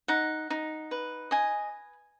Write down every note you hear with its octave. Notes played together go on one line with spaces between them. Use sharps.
D#4 F#5
D#4
B4
D#5 G#5